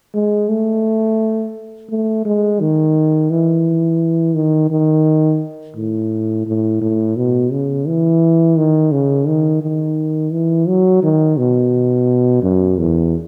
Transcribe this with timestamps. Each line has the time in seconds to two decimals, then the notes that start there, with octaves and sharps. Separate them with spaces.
0.14 G#3
0.49 A3
1.90 A3
2.25 G#3
2.60 D#3
3.30 E3
4.35 D#3
4.71 D#3
5.76 A2
6.47 A2
6.81 A2
7.16 B2
7.52 C#3
7.87 E3
8.57 D#3
8.92 C#3
9.27 D#3
9.62 D#3
10.32 E3
10.68 F#3
11.03 D#3
11.37 B2
12.42 F#2
12.78 E2